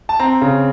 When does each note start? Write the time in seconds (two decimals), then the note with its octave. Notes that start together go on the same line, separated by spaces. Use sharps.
0.09 A5
0.19 C4 A#5
0.41 C#3